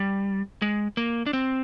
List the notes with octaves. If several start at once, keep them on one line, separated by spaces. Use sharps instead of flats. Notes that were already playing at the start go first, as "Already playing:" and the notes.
Already playing: G3
G#3
A#3
D4
C4